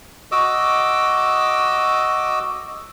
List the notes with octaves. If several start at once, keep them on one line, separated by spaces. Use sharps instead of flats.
F#4 D#5 D6 E6